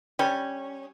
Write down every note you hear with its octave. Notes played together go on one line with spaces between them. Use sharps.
G3 C#4